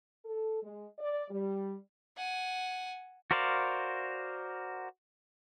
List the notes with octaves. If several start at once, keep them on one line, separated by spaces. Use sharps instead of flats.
A4
G#3
D5
G3
F#5 G#5
F#4 A#4 C5 D5 F5